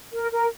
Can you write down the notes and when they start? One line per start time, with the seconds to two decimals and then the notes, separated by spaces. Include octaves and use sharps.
0.13 A#4
0.31 A#4